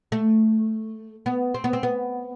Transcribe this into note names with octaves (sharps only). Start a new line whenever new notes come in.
A3
B3
C4
B3
C4
B3